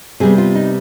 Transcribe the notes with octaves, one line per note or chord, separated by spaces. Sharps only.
C3 G3 B3 G#4
F4
D#4